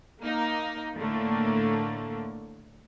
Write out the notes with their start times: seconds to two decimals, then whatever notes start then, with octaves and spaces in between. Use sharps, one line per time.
0.20 A#3 D#4
0.98 A2 D3 A3 A#3